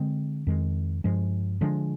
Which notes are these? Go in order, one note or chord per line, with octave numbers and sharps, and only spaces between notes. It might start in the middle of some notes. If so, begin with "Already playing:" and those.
Already playing: D3 G#3 C4
F2 D#3 G#3
G2 F3 G#3
D3 F3 G#3 D4